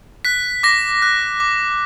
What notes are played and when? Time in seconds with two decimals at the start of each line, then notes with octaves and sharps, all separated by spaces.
0.25 F#6 B6
0.63 D6 A#6
1.02 F#6
1.40 D6